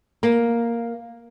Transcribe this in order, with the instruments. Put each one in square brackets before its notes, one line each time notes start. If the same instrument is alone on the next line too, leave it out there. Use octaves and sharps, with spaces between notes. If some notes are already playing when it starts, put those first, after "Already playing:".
[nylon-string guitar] A#3